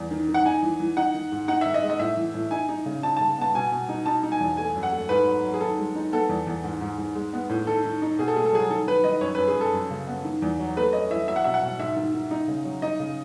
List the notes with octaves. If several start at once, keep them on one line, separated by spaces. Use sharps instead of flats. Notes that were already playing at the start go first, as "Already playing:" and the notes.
Already playing: E2
D#3
D#3
F#5
D#4 G#5
E3
E3
D#4 F#5
D#3
G#2
D#4 F#5
D#3 E5
D#5
G#3
D#5
A2 E5
E3
A2
D#4 G#5
D#4
C#3
D#4 A5
A5
C#3
B3 A5
B2 G#5
B2
D#4
D#4 A5
D#4
G#5
E2
A3 G#5
F#2
F#5
A3
G#2 B4
F#3
F#3
G#4
D#3 A4
G#3
D#4
B3 A4
E2
E2
G#2
G#2
G#2
G#3
B3
A2
D#3 A4
D#3
D#4
B2 G#4
A4
A3 G#4
A4
F#3 G#4
D#3 A4
D#3 B4
D#3 D#5
F#2 C#5
B4
F#2
G#4
F#2 A4
F#2
C#3
B3
D#3
E2
F#3
A3 B4
C#4 D#5
E3 E5
F#3 E5
F#5
B2 E5
F#5
B2
G#2 E5
D#3
D#3
D#4
C#3
F#3
D#4 D#5
C#3